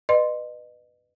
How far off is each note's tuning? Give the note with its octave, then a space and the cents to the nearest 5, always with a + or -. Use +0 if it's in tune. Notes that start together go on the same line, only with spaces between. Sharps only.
B4 +0 D#5 -30 C6 -5